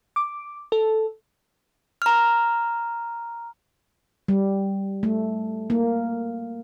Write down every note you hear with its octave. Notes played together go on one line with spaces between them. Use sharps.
D6
A4
A#5 F6
G3
A3
A#3